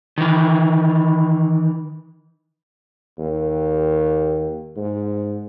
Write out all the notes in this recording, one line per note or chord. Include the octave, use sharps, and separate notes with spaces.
D#3 E3
D#2
G#2